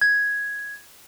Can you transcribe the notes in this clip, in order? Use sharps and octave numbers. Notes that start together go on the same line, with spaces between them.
G#6